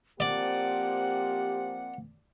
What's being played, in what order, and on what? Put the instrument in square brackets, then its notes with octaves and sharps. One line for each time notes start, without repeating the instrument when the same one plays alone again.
[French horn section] F3 A#3 C4 [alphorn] G4 [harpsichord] D5 [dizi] F#5